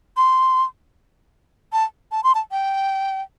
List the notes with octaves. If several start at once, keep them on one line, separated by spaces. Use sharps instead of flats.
C6
A5
A5
C6
A5
G5